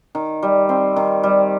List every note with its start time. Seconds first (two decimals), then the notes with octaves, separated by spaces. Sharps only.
0.15 D#3
0.43 G3
0.69 C4
0.96 D#3
1.23 G3